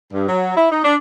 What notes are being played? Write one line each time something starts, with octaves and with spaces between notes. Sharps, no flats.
G2
F#3
E4
D#4
D4